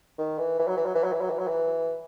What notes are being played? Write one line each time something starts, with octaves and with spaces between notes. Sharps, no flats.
D#3
E3
E3
F#3
E3
F#3
E3
F#3
E3
F#3
E3
F#3
E3